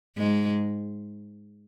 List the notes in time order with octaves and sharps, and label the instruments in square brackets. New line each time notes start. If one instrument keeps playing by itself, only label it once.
[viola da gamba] G#2 G#3